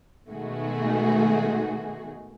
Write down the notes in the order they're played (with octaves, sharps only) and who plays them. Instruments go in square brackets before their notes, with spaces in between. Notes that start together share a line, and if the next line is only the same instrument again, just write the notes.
[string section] B2 D#3 G#3 A3 F#4 G#4